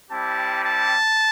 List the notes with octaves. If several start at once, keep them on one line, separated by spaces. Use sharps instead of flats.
G3 C4 E4 G4 A5
A5